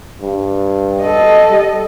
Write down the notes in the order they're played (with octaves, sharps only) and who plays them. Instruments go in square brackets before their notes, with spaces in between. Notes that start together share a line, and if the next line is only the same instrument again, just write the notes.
[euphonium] G2
[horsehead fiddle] A4 D#5
[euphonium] G3